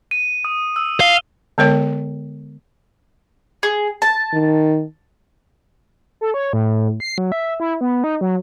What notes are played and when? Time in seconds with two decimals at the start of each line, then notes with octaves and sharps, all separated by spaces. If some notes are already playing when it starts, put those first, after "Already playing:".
0.11 D#7
0.45 D#6
0.76 E6
1.00 F5 G7
1.58 D3 G#3 B3 A#4 C#5 G5
3.63 G#4
4.02 A5
4.33 D#3
6.21 A4
6.34 C#5
6.53 A2
7.00 C7
7.18 F#3
7.32 E5
7.60 E4
7.81 B3
8.04 D#4
8.21 F#3